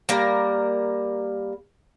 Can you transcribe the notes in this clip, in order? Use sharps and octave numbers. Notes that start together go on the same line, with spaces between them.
G3 A#3 A#4